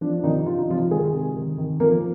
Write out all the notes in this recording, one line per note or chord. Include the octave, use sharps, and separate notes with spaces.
F3 D4
D4
C3 D#3 D#4
C3 F4
D#4
C3 F3 F4
D#3 G#3 G#4
C3
D#3
D#3
F3 A#3 A#4